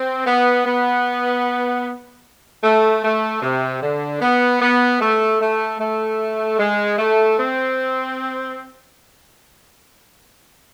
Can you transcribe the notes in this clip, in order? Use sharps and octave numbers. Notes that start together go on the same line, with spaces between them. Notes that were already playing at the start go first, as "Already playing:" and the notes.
Already playing: C4
B3
B3
A3
A3
C3
D3
B3
B3
A3
A3
A3
G#3
A3
C4